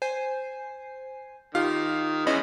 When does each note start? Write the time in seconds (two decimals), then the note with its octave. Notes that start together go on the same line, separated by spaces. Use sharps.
0.02 C5 G#5 C7
1.55 D#3 F4 G4 F5
2.27 E3 G#3 B3 C#4 D#5 B5